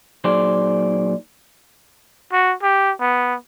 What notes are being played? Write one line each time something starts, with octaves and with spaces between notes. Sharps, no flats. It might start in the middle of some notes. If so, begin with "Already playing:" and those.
A#2 F#3 D#4 G#4 C5 D5
F#4
G4
B3